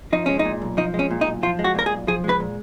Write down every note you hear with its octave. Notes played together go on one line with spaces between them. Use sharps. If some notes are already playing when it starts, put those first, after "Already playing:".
F3 D#4
G#3 C#4
D#4
A#2
B1
F3 D#4
G#3
C#4
A#2
D#4
B1
F3 F4
G#3
F#4
A#2 A#4
G#4
B1
F3 G#4
G#3
B4
A#2